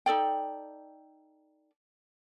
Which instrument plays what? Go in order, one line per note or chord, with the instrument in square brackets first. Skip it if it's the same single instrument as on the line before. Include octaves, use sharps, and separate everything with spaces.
[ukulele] D#4 A4 D5 G5